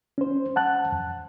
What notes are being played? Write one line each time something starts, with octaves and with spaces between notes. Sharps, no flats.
C#4 C5
F#5 A5 F#6
F2